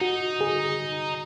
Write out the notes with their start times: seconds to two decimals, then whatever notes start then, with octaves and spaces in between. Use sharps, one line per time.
0.01 D#4 F#4
0.41 G#4